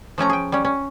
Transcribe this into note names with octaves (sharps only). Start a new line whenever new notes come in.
F3 A3 C#4 A#5
G#4 G5
G3 C#4
C#4